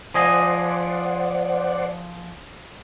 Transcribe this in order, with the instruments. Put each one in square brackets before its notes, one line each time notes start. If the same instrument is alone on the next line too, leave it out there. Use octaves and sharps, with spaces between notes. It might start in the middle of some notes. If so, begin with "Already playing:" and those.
[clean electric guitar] F3 G#4 D#5 [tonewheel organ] C5 D5 F#5